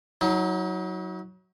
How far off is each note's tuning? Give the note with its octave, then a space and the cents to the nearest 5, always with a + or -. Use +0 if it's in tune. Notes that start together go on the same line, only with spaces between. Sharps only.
F#3 +0 D#4 +45